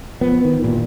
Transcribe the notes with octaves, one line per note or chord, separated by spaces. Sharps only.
F3 B3
D#3
G2 A#2 E3